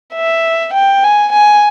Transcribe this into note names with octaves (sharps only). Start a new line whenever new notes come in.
E5
G5
G#5
G#5